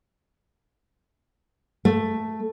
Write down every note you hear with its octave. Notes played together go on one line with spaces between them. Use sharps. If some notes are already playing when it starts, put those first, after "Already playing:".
A3